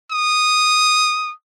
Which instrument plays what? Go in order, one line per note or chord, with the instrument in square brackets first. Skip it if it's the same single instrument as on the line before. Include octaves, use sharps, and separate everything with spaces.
[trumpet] D#6